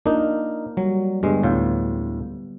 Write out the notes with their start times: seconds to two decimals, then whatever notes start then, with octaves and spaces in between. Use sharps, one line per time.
0.06 A#3 D4 D#4 F4 A#4
0.77 F#3 G3
1.23 G2 D3 G#3 B3 G4
1.43 D2 A2 F#3 B3 F4